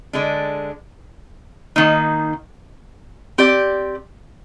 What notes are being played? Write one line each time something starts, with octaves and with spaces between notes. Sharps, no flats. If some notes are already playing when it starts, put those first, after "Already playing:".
D3 G#3 D4
D#3 A#3 D#4
C4 G4 D5